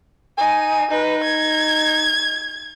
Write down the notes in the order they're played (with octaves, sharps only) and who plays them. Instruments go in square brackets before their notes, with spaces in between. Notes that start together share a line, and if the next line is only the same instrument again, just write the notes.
[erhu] D#4 [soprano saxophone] G#5
[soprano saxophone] D#4 [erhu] B4
[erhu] G#6